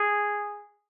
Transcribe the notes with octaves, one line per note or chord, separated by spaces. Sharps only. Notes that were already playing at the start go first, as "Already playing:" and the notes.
Already playing: G#4